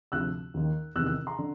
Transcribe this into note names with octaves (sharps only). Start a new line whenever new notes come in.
D2 C3 F3 E6 F#6
D#2 D#3
E2 C3 D#3 E6 F#6
E6 F#6
A#5 C6
D3